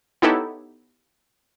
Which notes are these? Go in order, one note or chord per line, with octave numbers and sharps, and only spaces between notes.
B3 D#4 E4 G4 A4 C#5